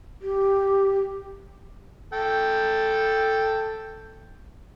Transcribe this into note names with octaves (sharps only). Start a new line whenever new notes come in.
G4
A4 G5